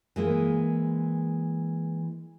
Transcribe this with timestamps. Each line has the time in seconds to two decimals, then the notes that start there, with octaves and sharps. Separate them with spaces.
0.16 E3 G#3 A#3